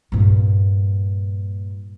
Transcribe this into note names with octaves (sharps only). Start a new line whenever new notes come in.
G2 A#2